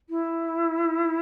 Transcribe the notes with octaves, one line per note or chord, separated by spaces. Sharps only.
E4